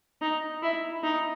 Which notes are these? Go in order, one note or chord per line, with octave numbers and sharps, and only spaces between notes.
D#4
E4
D#4